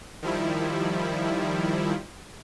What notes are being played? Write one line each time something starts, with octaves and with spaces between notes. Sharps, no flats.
D#3 F3 G3 E4